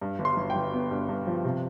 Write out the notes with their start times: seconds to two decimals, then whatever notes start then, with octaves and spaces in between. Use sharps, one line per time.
0.02 G2
0.19 G1
0.25 C6
0.37 G1
0.50 G5
0.56 G1
0.74 B3
0.91 G2
1.09 G2
1.27 F3
1.44 C3